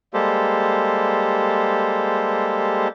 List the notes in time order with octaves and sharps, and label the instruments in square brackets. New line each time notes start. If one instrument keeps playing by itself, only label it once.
[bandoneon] G3 G#3 A#3 G4 A4 C5